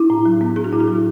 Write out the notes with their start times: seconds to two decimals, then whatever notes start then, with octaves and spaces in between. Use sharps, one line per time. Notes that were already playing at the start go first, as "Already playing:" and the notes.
Already playing: D4 E4
0.10 A2
0.25 F#3
0.41 B3
0.56 D4 G#4
0.64 F#4
0.73 A2 E4
0.80 F#4
0.88 F#3